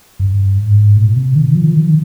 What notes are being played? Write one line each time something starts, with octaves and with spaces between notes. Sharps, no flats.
G2
G#2
A#2
C3
D#3
F3
D#3